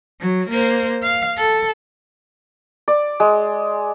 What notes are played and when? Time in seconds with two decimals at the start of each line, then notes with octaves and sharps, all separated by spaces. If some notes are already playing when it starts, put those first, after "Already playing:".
0.21 F#3
0.50 A#3 C5
1.02 F5
1.37 A4
2.88 D5
3.20 G#3